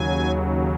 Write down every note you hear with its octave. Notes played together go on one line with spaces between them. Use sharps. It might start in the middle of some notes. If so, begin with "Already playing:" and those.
Already playing: D#2 C#3 F#3 G#5